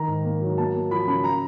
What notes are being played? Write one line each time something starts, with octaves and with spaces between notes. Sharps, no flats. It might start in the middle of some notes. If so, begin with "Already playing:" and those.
Already playing: D#3 A#5
G#2
A#3
F#3
A#3 A5
A#3
F3 B5
C#3 B5
A#5